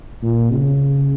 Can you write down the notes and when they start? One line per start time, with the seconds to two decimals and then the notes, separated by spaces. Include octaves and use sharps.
0.22 A#2
0.52 C#3